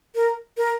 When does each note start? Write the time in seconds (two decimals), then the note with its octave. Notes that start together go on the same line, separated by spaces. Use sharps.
0.15 A#4
0.57 A#4